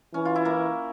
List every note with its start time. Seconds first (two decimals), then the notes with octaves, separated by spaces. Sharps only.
0.14 E3 C#4
0.25 F4
0.35 E4
0.45 A#3